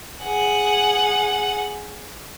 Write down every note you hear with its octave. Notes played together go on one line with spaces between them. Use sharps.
G#4 F#5